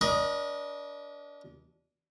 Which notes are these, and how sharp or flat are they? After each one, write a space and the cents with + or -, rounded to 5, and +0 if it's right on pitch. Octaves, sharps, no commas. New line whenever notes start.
D4 -25 A#4 +45 D#5 -5